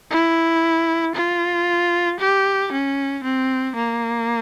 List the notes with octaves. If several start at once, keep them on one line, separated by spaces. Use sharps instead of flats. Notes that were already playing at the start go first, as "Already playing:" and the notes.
E4
F4
G4
C#4
C4
A#3